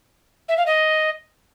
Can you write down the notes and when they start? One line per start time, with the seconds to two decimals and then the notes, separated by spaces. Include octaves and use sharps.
0.48 E5
0.57 F5
0.66 D#5